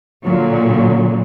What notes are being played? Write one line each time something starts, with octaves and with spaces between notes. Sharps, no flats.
A#2 D3 F#3